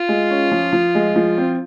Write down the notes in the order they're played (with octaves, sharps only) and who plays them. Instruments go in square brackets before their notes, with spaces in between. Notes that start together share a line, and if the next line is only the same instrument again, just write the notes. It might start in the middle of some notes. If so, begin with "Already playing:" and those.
Already playing: [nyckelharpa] F4
[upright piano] G#3
C#4
F3
F3
G#3
F3
C4